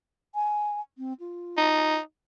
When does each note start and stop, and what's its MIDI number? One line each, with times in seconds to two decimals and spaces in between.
0.35 0.81 80
0.98 1.13 60
1.20 1.97 65
1.58 1.99 63